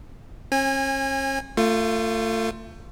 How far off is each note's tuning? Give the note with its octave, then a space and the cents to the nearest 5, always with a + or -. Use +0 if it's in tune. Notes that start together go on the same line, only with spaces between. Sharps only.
C#4 -45 G#5 -25
A3 +30 F4 +0